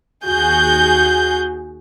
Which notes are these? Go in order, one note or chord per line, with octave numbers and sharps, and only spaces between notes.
D#2 F#4 G#4 G6